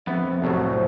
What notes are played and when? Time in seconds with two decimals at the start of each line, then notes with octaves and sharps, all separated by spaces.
0.07 F2 B3 E5
0.42 C2 A2 F#3 C5